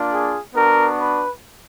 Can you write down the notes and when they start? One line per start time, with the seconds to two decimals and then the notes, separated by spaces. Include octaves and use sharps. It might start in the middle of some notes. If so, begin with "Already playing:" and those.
Already playing: A#3 D4 F4
0.10 G#4
0.55 B3 D4 F#4 A#4
1.00 B4